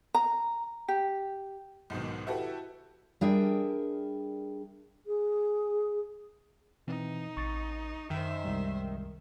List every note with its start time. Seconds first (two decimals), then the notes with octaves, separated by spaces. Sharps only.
0.14 A#5
0.88 G4
1.90 B1 G#2 B2 D#3
2.27 E4 F#4 G4 A4 B4
3.21 G3 D4 G#4 A#4 E5 G5
5.06 G#4
6.87 B2 E3 C4 D#4
7.37 A1 C#6 A6
8.10 F#2 D#3 C5 E5
8.44 C2 G3 G#3